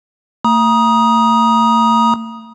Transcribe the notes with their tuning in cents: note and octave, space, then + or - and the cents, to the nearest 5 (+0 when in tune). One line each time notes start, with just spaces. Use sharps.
A3 +45 A#5 +35 D#6 +0